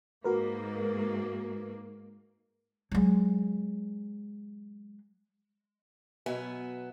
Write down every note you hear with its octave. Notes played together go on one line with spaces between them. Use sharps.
G#2 A#3 F#4 A#4 B4
F#3 G#3
B2 F#3 B3 E5 G#5